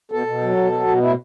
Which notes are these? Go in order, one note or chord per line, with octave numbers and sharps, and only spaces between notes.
B2 A4
B2
F#3
B2
F#3
B2
A2 E4